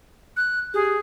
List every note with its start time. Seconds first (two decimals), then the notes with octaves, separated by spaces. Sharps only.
0.37 F#6
0.74 G4 G#4